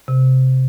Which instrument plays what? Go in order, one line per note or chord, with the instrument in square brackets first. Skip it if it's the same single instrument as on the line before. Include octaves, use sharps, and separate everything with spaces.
[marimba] C3